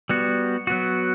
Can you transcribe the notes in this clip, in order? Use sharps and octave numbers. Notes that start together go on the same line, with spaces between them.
G3 B3 F#4
F#3 B3 F#4